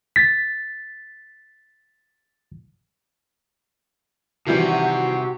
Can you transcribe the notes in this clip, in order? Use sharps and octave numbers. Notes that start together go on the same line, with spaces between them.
A6 B6
C3 D#3 E3 G3 F#4